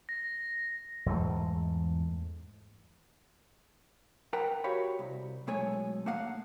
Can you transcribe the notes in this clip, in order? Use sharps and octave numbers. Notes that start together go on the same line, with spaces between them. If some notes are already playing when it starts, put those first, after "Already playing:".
A#6
E2 G#2 A3
A#4 B4 F#5 G5
F#4 G4 C#5 F5 B5
C2
B1 G#3 A3 A4 C#5 G#5
A3 A#3 F5 F#5